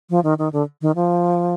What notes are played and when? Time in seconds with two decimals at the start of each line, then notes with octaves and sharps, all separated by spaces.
0.10 F3
0.24 D#3
0.39 D#3
0.53 D3
0.82 D#3
0.96 F3